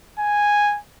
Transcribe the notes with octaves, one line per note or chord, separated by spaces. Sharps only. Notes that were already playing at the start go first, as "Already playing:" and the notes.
G#5